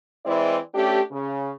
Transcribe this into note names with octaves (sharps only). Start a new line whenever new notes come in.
E3 G#3 C4 E4 D5 D#5
A3 C#4 D4 G4
C#3